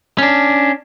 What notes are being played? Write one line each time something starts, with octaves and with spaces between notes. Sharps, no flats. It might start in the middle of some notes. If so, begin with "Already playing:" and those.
C#4 D4